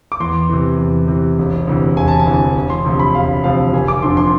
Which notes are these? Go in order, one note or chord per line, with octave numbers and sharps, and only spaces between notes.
D6
E2 C6
C3 E3
E2
C3 E3
E1
D2 C3 E3
E1 G#5
A5
G#5
D2 C3 E3
E1
C6
D2 C3 F3
B5
E1 F5
D2 C3 F3 F5
F1 G#5
D6
F2 D3 F3 C6
C6